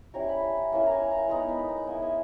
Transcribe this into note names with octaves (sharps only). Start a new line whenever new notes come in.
G3 C#4 E4 A#5
B5
B5
A#5
A#3 C#4 E4 G#5
A#5
G#5
A#5
G#3 B3 D#4 A#5
B5
A#5
A#3 E4 G#5
E5